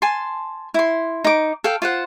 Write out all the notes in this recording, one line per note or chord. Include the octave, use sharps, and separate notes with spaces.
G#5 A5 C6
E4 C6
D#4 D6
A4 F5 G5
F4 C5 F#5